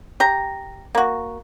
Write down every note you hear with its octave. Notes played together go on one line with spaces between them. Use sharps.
G4 A#5
A#3 F#4